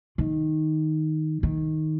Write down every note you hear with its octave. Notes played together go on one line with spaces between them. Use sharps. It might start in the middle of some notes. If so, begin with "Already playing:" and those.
D#3
D#3